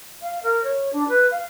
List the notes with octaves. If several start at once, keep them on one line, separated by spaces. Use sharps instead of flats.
F5
A#4
C#5
D4
B4
F5